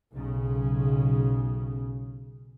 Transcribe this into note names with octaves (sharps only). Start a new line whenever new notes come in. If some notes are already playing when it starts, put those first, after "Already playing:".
B1 C#3